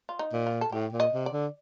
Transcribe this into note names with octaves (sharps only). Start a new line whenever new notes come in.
F4
D#4
A#2
F4
A4
A2 G4
A#2
D#5
C3
D5
D3